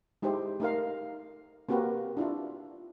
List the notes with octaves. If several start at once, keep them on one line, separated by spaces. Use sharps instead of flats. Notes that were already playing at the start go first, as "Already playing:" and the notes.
G#3 D#4 E4 G4 C5
A3 D#4 A#4 F5
A#3 C4 F#4 G4 A#4 B4
D4 E4 F4